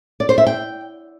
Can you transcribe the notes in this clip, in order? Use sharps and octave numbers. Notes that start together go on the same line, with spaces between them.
D5
C5
E5
G5